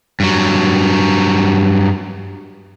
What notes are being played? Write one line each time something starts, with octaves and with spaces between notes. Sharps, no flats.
G2 F#3